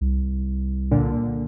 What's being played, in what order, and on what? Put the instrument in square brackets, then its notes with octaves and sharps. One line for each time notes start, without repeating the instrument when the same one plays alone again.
[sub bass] C2
[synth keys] A#2 D3